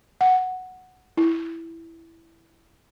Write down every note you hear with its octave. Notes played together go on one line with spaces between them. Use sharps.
F#5
E4